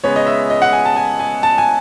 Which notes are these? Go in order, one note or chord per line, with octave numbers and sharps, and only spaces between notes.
C#3 G#3 B3 C#5
D#5
E5
D#5
F#5
G#5
A5
G#5
G#5
A5
G#5